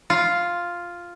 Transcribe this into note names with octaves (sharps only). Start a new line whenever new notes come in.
F4